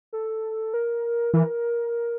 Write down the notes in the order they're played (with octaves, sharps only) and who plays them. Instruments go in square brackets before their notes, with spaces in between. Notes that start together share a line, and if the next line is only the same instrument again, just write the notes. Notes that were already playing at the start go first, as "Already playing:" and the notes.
[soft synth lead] A4
A#4
[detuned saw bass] E3 [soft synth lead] A#4